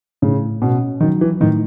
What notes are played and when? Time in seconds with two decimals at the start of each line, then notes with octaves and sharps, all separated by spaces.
0.22 A2 C#3
0.62 B2 C#4
1.00 D#3 F#3
1.21 E3
1.40 A2 D#3